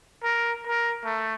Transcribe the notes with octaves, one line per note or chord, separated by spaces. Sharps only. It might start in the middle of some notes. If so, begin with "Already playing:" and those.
A#4
A#4
A3